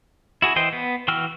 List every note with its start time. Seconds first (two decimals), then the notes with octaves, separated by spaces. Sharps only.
0.42 E4 F#4 G#4
0.56 E3 C5 D#5 G5
0.73 B3
1.08 E3 F#4 G5 E6 F6